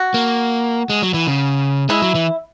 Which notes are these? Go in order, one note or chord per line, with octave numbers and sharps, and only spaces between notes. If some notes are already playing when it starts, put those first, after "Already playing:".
Already playing: F#4
A#3
G#3
F#3
E3
C#3
G#3 E4
F#3
E3